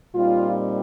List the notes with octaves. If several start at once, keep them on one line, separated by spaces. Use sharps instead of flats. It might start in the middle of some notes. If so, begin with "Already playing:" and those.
A#2 G3 C4 D#4 F4